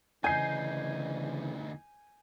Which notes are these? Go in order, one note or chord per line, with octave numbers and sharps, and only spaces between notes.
D2 C#3 E3 D#4 G#5 G6 C7